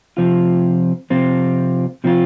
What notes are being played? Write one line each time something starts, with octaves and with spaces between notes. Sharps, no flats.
C3 F3 C4 F4
C3 F3 C4 F4
C3 F3 C4 F4